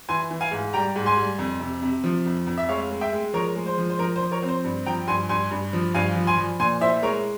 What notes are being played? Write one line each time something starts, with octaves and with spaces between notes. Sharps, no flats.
E3 G#5 C6
E3
F5 G#5
G#2
G3 G5 A#5
G#2
G#5 C6
G3
F2
C3
C3
F3
F2
F2
E5
G#3 C#5 F5
G#3
E5 G5
G#3
F3 A#4 C#5
G#3
C5
F3
C5
F3 A#4
C5
F3
A#4 C#5
C4
C5
G2
F3 G5 A#5
G2 G#5 C6
G2 G#5 C6
G2
F3
G2 F5 G#5
F3
G#5 C6
F3
A#2 G#5 C6
E4 C5 E5
G#3 A#4 C#5